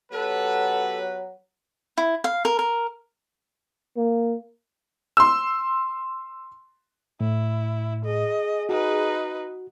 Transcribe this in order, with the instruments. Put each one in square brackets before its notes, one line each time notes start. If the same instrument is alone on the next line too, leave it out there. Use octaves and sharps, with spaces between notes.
[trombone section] F#3 [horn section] B3 G4 B4 [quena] A4
[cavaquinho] E4
F5
A#4
A#4
[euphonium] A#3
[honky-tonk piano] C6 E6
[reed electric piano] A2 [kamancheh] E4
[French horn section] G#4 [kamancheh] D#5
[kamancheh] D#4 B4 [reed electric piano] F#4